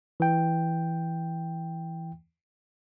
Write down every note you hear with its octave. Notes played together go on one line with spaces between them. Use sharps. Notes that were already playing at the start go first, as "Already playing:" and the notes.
E3 G5